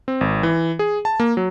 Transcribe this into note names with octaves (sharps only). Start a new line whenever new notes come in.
C4
G#1
E3
G#4
A5
A#3
F#3